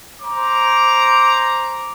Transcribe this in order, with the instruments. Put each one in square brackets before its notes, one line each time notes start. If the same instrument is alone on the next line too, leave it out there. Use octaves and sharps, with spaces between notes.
[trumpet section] C5 A#5 D6